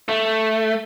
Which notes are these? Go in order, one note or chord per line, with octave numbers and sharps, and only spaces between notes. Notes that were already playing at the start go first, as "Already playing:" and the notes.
A3